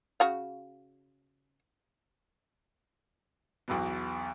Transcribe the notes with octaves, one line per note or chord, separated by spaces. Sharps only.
C#3 F#4 F5
B1 E2 B2